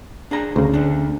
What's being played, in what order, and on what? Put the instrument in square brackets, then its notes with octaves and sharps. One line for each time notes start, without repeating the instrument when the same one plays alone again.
[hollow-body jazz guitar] D4 G#4 A#5
[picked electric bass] D2 C#3
[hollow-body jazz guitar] D3 A3 D4